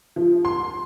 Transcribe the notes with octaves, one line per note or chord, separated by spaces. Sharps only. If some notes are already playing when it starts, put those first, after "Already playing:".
F3
C6